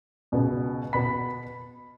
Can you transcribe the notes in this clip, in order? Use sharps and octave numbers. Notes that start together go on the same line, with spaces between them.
C#2 B2 B3
B2 B3 B5 B6